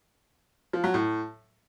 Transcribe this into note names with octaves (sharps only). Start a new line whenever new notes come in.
F3
F#3
A2